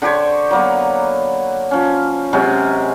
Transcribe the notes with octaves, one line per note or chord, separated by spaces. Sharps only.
D3 G4 C5 C#5
F#3 A#3 B3
F3 C#4
C3 F#3 G#3 C#4